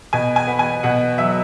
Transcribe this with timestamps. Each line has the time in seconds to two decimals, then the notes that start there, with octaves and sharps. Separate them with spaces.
0.13 B2 G#5
0.36 G#5
0.47 B3
0.59 G#5
0.83 B2 F#5
1.18 F#3 E5